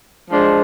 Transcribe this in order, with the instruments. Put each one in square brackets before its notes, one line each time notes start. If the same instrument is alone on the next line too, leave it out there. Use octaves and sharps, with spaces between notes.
[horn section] F3 G#3 D4 G#4 C5